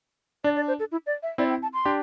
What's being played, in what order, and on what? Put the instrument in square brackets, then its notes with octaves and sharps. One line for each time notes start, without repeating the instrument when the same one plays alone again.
[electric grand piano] D4 [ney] D5
[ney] D5
C5
A4
E4
D5
E5
[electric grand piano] C4 E4 [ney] D5
[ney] G5
A5
C6
[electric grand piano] D4 G4